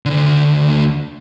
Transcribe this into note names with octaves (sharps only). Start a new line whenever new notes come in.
D2 D3